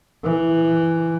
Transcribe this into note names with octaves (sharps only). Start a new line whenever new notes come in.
E3